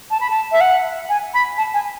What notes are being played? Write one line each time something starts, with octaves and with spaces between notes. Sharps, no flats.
A5
B5
A5
E5
F#5
G#5
B5
A5
G#5